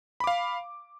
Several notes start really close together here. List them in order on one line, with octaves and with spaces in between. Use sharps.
B5 D6 F5